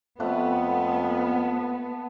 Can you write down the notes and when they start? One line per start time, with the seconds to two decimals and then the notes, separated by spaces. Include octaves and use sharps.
0.20 F2 A3 B3 F#5